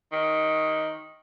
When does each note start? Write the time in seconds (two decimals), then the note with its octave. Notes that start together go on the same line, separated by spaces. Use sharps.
0.12 D#3